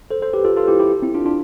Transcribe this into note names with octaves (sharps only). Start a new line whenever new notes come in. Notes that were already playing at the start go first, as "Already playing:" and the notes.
A4 C5
A4 C5
G4 B4
F4 A4
F4 A4
E4 G4
E4 G4
C4 E4
D4 F4
D4 F4